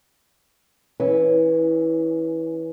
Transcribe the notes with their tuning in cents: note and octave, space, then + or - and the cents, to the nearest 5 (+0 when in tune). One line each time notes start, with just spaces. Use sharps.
E3 -15 C#4 +5